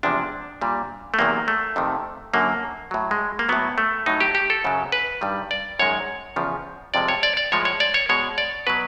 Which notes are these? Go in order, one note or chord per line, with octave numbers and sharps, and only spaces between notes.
E2 C3 F3 G#3 D4
A#2 G3
A3
E2 C3 D#3 F#3 A#3
A3
F2 C3 D#3
F#2 D3 F#3 A#3
A2 F#3
G#3
A#3
A2 F#3 B3
A3
A2 F#3 D#4
G4
G4
A4
F#2 C#3 F#3
B4
G2 D#3 G3
D5
F#2 D#3 G#3 C#5
E2 C#3 F3
F2 C3 F3 G#3 D5
C#5
D5
D5
A2 F3 G#3 C#5
C#5
D5
C#5
B2 G#3 C#5
D5
B2 F#3 B4